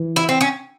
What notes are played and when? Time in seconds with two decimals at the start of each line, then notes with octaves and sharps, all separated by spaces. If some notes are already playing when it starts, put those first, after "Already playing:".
Already playing: E3
0.16 E4
0.29 C4
0.41 C#4